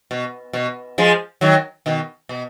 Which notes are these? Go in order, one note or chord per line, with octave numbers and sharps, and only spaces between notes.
B2
B2
F3 G#3
D#3 F#3
B2 D#3
B2